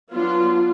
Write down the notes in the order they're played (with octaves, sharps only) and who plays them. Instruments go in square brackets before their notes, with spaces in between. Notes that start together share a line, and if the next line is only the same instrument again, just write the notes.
[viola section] F#3 B3 D4 F4